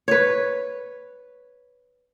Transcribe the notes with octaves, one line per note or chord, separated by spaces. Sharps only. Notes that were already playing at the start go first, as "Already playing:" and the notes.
B4 C#5